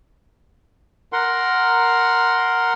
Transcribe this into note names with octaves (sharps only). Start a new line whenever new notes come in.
A#4 F#5 C6